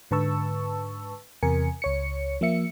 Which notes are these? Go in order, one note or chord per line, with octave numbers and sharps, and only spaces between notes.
G#2 D3 B4 A5 C#6 E6
E2 C3 A#4 G#5 C#7
C#2 C#5 C#7
F3 A#3 E5 C#7